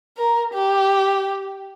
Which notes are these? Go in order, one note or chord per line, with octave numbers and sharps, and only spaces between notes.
A#4
G4